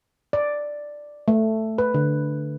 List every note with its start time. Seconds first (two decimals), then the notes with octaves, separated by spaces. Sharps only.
0.33 D5
1.28 A3
1.78 B4
1.94 D3